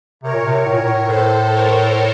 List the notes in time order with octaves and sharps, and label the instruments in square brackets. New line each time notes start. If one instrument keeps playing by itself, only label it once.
[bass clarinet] C3 [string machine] A#4 C#5
[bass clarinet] A#2
C3
[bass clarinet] A2 [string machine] A#4 C#5
[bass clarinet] A#2
A2
[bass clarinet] A2 [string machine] A4 C5
[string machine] A#4 C#5